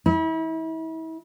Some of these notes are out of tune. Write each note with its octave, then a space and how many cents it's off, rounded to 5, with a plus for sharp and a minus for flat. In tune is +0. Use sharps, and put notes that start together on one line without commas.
E4 -35